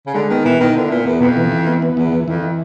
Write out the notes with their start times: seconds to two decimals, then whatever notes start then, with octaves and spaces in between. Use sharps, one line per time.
0.06 C#3
0.14 D3 G#3
0.30 D#3 B3
0.45 B2 E3
0.60 D#3 B3
0.75 D3 E4
0.90 A#2 B3
1.06 E2 B3
1.20 F2 B2
1.37 E3
1.52 E3
1.67 B3
1.82 B3
1.97 E2 E3
2.12 E3
2.27 F2 E3
2.42 E3